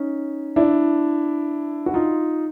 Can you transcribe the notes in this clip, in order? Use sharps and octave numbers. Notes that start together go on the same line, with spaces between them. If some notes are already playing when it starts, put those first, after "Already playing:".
Already playing: C#4 D#4
D4 E4
F#4
D#4 F4